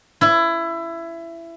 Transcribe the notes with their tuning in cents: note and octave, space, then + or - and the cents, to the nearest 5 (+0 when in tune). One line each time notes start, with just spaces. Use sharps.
E4 +20